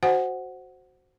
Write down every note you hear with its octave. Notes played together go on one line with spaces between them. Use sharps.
F#4 C5 F#5 G#5